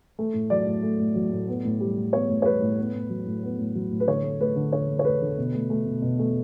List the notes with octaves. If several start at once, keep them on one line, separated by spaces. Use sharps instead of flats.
A3
A2
F#3 D5
A2
A3
A2
F#3
A2
B3
A2
G3
A2
B3 C#5
A2
C#5
G3 B4
A2
B3
A2
F#3
A2
B3
A2
F#3
A2
B4
D3 C#5
A3
A3 B4
D3
D3 C#5
A3
C#5
A3 B4
D3
B2
A3
A3
B2
B2
A3